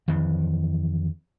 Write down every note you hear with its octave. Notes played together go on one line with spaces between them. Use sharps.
F2 D#3 E3